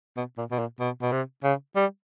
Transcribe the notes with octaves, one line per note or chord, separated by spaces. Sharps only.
B2
A#2
B2
A#2
B2
B2
C3
C#3
G3